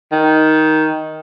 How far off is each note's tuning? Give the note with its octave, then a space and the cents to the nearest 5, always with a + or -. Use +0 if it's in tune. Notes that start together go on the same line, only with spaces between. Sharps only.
D#3 +10